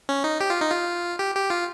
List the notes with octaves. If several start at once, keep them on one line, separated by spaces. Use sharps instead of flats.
C#4
D#4
G4
F4
D#4
F4
G4
G4
F4